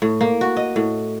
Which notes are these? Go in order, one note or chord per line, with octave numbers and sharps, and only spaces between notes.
A2
A#3
F#4
D#5
A2